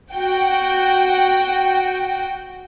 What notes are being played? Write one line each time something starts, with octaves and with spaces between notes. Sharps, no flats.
F#4 G5